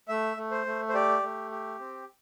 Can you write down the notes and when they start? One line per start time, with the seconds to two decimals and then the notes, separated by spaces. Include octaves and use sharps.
0.08 A3 E5
0.37 A3
0.51 C5
0.66 A3
0.89 C5
0.94 G4 D5
1.22 A3
1.51 G4
1.79 C4